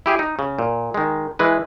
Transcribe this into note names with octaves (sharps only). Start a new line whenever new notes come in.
E4 G4 G#4
D#4
C#3
A#2
D#3 G#3
E3 G#3 B4